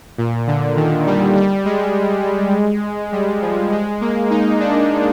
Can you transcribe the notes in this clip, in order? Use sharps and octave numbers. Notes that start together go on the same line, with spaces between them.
A#2
D3
D#3
G3
G3
G#3
G3
F3
G#3
A#3
D#4
D4